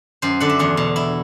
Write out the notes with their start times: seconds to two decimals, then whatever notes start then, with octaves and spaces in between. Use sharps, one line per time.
0.22 F#2 C5
0.40 D3 F#5
0.50 E5
0.59 E2 F#5
0.77 B2
0.96 E4